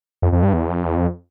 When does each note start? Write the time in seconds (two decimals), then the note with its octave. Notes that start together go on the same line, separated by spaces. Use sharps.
0.22 F2
0.32 F2
0.43 G2
0.53 E2
0.70 F2
0.85 E2
0.96 F2